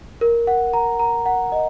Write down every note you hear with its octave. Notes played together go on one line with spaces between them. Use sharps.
A#4
F#5
A#5
A#5
F#5
D#5